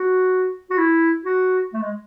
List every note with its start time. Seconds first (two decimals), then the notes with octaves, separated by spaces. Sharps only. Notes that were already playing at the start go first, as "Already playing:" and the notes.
Already playing: F#4
0.70 F#4
0.78 E4
1.25 F#4
1.74 A3
1.82 G#3